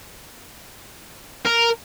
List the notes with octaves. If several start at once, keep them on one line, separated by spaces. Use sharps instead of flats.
A#4